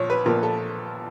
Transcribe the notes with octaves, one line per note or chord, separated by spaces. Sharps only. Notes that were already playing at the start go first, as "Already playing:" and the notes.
Already playing: A#1 A#2 F3 C#5
B4
A#1 A#2 F3 A#4
A4